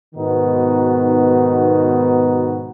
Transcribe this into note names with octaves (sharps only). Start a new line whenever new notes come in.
G#2 B2 D#3 B3 D#4 F#4